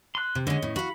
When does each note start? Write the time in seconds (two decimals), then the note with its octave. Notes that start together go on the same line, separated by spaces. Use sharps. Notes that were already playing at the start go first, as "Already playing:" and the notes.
0.15 C6 F#6
0.35 C3
0.47 D3 G#3 C#4 D#5
0.62 A2
0.76 F#4 F5 B5